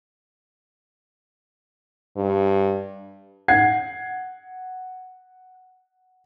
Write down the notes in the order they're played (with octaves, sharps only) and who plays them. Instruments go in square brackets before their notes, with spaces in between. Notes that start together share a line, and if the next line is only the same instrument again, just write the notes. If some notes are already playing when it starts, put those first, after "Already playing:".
[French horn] G2
[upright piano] F#5 G#6 C7